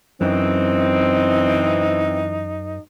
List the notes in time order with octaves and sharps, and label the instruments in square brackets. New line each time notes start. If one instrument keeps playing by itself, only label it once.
[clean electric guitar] F#2 [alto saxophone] E3 [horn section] C4 [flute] D#4